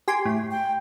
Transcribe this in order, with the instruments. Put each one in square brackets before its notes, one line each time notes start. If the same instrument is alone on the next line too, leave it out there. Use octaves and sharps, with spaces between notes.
[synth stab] G4 G#5 C6
A2
[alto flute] G5